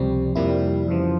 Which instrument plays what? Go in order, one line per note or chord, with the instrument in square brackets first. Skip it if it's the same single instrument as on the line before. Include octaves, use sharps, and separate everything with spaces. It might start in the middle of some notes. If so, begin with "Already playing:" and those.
Already playing: [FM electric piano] C#2 C3 F3 C4 [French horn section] G3
[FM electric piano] F2 C3 F3 A#3 E4 [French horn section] G3
[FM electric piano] F2 C#3 E3 [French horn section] F3